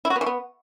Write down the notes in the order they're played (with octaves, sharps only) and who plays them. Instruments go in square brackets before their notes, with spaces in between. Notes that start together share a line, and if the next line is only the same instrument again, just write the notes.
[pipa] E4
F#4
B3
E3
B3